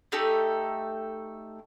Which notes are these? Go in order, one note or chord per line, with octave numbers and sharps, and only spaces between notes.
A3 D#4 G4 A4